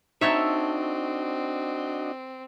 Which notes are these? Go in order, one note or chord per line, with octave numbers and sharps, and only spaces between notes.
C4 D4 D#4 F#4 A4 C#5 D#5 E5